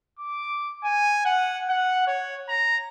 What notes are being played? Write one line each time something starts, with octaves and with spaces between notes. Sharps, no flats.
D6
G#5
F#5
F#5
C#5
A#5